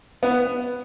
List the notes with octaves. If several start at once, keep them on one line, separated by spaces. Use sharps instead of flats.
B3